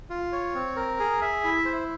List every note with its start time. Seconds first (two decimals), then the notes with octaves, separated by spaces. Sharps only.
0.10 F4
0.32 C#5
0.55 C4
0.76 A#4
1.00 G#4
1.22 E5
1.44 E4
1.65 C5